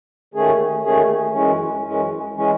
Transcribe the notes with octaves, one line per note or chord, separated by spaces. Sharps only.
D#2 D#3 A3 C#4 G#4
D#2 D#3 A3 C#4 G#4
F#2 E3 G#3 C#4
F#2 E3 G#3 C#4
E3 G#3 C#4